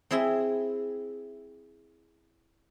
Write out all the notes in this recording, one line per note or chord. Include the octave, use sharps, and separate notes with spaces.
C4 E4 G#4 E5 C6